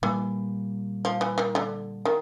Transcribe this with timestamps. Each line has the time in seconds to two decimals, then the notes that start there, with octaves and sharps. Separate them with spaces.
0.02 A#2 E3 G3 A#3
1.05 F3
1.21 E3
1.38 D#3
1.55 D3
2.05 D#3